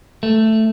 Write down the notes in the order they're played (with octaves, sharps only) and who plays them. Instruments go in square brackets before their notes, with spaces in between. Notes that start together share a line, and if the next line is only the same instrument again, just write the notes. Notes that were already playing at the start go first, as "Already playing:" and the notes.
[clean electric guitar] A3